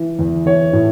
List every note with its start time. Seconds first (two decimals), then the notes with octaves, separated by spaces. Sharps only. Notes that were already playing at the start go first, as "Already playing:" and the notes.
Already playing: E3
0.19 E2
0.46 E3 C#5
0.73 A2